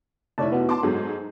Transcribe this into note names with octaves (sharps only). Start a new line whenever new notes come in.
F1 E4 C#5 D5 A5
B3 F#4
A5 C6 D6
G#2 F#3 A4